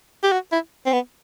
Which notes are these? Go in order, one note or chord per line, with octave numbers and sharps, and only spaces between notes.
G4
F#4
E4
C4
B3